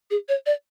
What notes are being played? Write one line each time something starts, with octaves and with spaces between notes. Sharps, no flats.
G#4
C#5
D5